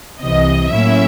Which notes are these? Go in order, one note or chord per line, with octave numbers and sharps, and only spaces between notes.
C2 C3 E3 D#5
A2 F#3 A#3 C#4 E4 E5